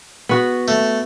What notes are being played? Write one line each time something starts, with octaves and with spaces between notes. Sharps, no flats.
B3 F#4
A3